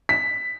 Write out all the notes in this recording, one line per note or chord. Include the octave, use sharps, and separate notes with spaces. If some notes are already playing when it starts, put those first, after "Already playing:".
B6